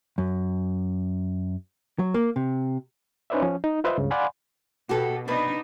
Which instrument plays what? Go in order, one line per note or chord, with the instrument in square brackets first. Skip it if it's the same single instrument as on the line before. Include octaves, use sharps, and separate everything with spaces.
[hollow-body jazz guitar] F#2
F#3
A#3
C3
[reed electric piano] C#4 D#4 B4 C5 D5 E5
F3 C#4
D#4
F4 B4 C5 D#5 E5
C#2 G2 C#3
D5 F5 F#5 G#5 B5 C6
[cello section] B2 [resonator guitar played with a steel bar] F#4 G4 A4
[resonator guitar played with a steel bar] C3 B4 [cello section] B3 D4 D#4